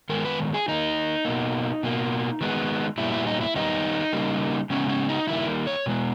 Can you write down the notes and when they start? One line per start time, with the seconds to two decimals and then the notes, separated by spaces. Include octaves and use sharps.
0.09 D#3 G#3 B3 A#4
0.25 B4
0.54 G#4
0.68 D#3 A#3 D#4
1.25 B2 A#3
1.83 B2 A#3
2.41 D#3 G#3 B3
2.98 A#2 G3 B3 E4
3.12 E4
3.27 D#4
3.41 E4
3.55 D#3 G3 B3 D#4
4.13 C#3 G3 A#3
4.70 C#3 G#3 B3 C#4
4.89 C#4
5.09 D#4
5.28 D#3 G3 A#3 E4
5.67 C#5
5.86 B2 G#3 B3